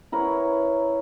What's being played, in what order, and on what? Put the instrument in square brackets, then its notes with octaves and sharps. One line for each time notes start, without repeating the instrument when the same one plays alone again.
[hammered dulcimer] E4 A#4 B4 C#5